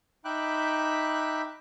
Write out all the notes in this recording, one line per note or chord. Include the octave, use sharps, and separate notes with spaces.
D#4 E5 G5 B5 D6 F#6